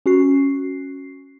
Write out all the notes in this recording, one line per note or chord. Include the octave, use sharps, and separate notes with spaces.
C#4 F#4 C7